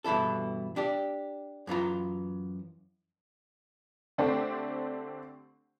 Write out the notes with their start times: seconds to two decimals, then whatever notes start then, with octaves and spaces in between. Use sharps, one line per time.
0.04 G2 B2 E3 E4 A4
0.76 D4 G4 D5
1.67 F#2 E3 F4 A#5
4.18 D3 A3 C4 D4 G4 C5